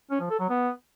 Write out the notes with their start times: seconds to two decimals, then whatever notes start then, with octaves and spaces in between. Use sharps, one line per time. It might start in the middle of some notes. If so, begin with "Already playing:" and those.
0.11 C#4
0.20 F3
0.30 A4
0.39 F#3
0.49 B3